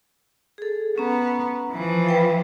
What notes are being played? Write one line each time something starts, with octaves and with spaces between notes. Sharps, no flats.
G#4 A4
B3 C#4 A#5
E3 F3
B4 G5